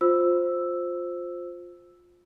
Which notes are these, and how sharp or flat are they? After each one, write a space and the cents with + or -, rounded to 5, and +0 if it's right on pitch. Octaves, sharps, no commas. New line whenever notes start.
F4 +20 C5 +0 E6 +0